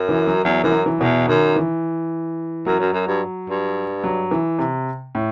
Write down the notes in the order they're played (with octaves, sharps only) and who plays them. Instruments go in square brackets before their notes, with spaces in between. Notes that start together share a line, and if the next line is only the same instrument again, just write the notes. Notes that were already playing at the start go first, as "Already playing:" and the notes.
Already playing: [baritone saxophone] F#2
[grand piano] E3
F#3
[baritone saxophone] E2 [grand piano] F#3
[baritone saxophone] F#2 [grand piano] E3
[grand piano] F#3
E3
[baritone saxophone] E2 [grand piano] B2
[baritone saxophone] F#2 [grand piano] D#3
[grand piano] E3
[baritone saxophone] F#2 [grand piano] F#3
[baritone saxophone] F#2
F#2
G2
G2
[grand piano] F#3
E3
C3
A2